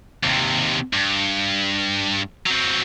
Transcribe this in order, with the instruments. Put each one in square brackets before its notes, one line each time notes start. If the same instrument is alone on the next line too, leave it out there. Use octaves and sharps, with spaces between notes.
[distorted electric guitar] D#2 C3
G2
F#3 C4